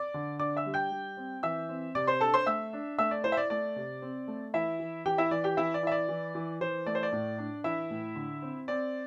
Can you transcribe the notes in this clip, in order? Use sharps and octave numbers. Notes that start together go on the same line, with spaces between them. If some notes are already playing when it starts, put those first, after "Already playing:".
Already playing: D5 D6
D3
D4 D5 D6
E5 E6
G3
G5 G6
G3
C4
E3 E5 E6
C4
C3 D5 D6
C5 C6
D4 A4 A5
C5 C6
A3 E5 E6
D4
A3 E5 E6
D5
E4 C5
E5
D5
A3 D5
C3
C4
A3
E3 E4 E5
E3
E3 G4 G5
E4 E5
E3 D5
G4 G5
E3 E4 E5
D5
E4 E5
D5
E3
E3
E3 C5
A3 D5
C5
D5
A2
D4
E3 E4 E5
A2
D3
C4
C4 D5